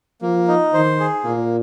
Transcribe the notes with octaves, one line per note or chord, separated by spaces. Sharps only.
F3 A#3
D#4
D#3 C5
G#4
A#2 A#3